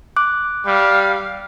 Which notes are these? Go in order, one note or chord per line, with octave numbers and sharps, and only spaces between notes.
D6 F#6
G3 F5